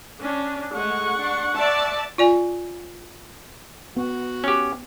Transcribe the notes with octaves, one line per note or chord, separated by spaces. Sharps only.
C#4 D4
G#3 A3 F#5 C#6
D4
D5 E5 A5
F4 D5 G#5
B3 F#4
C#4 G4